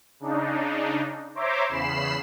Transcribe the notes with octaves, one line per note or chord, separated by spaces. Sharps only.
C#3 D4 D#4
C5 C#5 E5 A#5 C6 D6
E2 C#3 B5 C7 E7